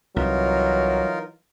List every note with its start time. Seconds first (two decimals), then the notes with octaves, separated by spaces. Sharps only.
0.16 C2 E3 F#3 D#4 F4 A#4